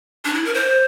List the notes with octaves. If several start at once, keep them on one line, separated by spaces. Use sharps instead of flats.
D4
E4
A#4
C5